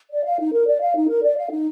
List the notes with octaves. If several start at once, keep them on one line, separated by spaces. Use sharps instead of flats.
D5
F5
D#4
A#4
D5
F5
D#4
A#4
D5
F5
D#4